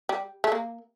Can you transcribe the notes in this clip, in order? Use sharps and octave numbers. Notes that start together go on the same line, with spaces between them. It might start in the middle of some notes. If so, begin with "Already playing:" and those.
G3
A3
A#3